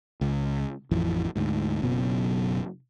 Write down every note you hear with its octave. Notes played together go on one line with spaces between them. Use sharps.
C#2
A1 F2 E3
D2 G#2
F#1 F#2 B2 F#3